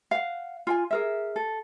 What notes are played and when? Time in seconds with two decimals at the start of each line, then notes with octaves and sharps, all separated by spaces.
0.11 F5 F#5
0.67 F4 G5 G#5
0.91 G#4 A#4 E5
1.36 A4